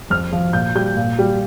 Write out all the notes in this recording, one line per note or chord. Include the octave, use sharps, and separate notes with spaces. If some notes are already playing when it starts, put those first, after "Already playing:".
F2 F6
F3
A#2 G6
G3 G6
A#2
G3